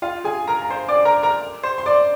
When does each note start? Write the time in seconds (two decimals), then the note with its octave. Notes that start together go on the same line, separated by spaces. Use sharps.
0.02 F4 F5
0.24 G#4 G#5
0.48 A#4 A#5
0.62 A#5
0.70 C5 C6
0.89 D5 D6
1.05 A#4 A#5
1.23 A#4 A#5
1.63 C5 C6
1.78 C6
1.86 D5 D6